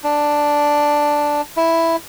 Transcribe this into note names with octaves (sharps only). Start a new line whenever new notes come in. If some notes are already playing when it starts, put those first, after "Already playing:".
D4
E4